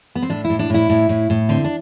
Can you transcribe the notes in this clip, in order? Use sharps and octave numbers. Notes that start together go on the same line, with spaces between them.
B3
C4
A2 D4
E4
A2
D4
A2 E4
A2
A2
A2
D3 C4
D4